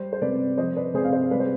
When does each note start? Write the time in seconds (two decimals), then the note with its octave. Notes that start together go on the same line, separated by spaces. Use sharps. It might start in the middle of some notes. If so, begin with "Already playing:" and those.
Already playing: G3 C5
0.13 C5
0.22 C3 B4 D5
0.58 F3 C5 D#5
0.76 B4 D5
0.94 C3 G#4 C5
1.04 F5
1.12 C5 D#5
1.31 G3 B4 D5
1.40 C5